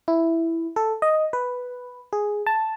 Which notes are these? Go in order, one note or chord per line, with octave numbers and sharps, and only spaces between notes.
E4
A4
D#5
B4
G#4
A5